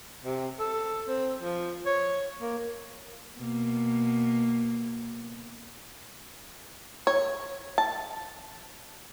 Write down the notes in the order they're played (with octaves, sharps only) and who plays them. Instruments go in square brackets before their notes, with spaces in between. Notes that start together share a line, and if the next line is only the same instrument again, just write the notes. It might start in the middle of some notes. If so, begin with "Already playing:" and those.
[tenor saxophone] C3
A4
C4
F3
C#5
A#3
[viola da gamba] B2 A#3
[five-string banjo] C#5
A5